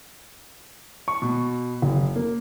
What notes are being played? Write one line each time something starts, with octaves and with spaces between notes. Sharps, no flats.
C#6
B2
F#1
A#3